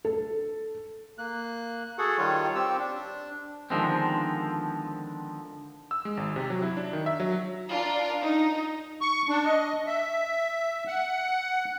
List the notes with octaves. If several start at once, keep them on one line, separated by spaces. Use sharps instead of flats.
A4
A#3 F#6
F#4 G#4 A4 F#5
D#3 G3 F4 C#5
C4 G4 E6
D4
D3 D#3 F3 G#3 B3 C4
E6
G#3
G#1
C3
F#3
E4
D4
D#3
E5
F#3
D4 F4 A#4
D#4
C#6
D4
D#5
E5
F#5